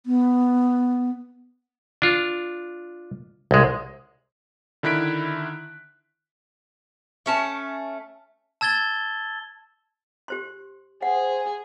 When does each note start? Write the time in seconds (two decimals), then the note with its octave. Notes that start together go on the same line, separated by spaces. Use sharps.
0.06 B3
2.02 D4 F4
3.51 C2 G#3
4.83 D3 D#3 E4 F#6 B6 D7
7.26 A3 C#4 A5
8.61 A5 E6 G#6 A6 G7
10.28 G4 C5 C6
11.02 G#4 C5 F#5